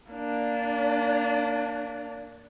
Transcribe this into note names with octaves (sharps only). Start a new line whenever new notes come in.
A#3 D4